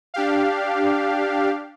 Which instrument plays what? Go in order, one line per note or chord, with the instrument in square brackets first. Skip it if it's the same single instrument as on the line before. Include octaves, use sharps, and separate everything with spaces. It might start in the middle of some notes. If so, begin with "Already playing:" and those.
[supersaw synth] D4 G4 F5